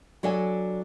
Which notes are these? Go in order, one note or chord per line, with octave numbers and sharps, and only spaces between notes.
F#3 D4 A4 D#5 G#5